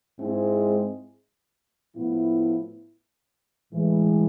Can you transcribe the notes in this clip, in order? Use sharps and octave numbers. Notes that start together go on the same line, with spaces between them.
G#2 G#3 C4 E4 G#4
A2 F3 B3 E4
A2 E3 G#3